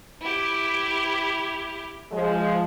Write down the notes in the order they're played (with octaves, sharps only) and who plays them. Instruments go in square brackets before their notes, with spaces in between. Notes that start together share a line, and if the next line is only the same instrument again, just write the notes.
[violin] E4 G4
[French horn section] F3 G#3